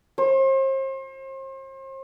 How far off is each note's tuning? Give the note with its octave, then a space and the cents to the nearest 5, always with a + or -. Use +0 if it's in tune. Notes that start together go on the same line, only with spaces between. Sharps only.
C5 +40